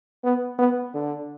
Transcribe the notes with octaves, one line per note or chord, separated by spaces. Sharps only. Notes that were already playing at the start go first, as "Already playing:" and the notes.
B3
B3
D3